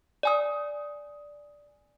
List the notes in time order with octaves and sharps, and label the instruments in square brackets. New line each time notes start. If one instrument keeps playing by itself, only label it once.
[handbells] D5 G#5 D#6